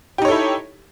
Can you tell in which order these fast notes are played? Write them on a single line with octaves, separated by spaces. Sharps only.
G4 D#4 C#5 A4 E4